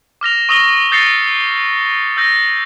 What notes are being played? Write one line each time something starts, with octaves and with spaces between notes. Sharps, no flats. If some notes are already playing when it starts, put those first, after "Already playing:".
D6 F6 A#6 F7
C#6 D#6 E6 A#6 F7 G7
D#6 G6 A6 A#6 C7 C#7
E6 G6 A#6